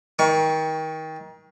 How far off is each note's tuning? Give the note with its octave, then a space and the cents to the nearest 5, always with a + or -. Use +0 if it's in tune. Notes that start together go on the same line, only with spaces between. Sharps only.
D#3 +30 C#6 +20